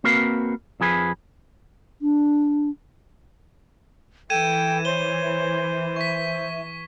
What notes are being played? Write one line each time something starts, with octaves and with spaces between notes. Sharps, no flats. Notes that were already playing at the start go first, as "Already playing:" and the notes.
A#3 C4 F#4 A#4 B4 F5
F2 F3 G#4 B4
D4
E3 A4 G5 G#6 D#7 E7
C5 C#5 G7
E5 C#6 B6